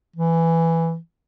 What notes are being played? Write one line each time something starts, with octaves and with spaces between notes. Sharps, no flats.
E3